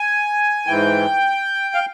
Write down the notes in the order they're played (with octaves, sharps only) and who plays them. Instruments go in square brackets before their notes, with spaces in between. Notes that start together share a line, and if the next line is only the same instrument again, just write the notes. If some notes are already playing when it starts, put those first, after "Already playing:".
Already playing: [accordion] G#5
G#2 E3 G5
F5